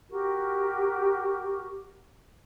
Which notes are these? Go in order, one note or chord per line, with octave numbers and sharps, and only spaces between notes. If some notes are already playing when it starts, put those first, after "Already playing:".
F#4 G4 A#4